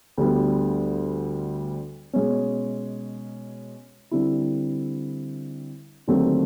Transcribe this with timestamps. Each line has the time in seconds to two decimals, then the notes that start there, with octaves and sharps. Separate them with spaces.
0.18 D2 D3 G3 B3
2.13 B2 G#3 C#4
4.11 D3 G3 C4 E4
6.07 D#2 D3 F#3 A3 C4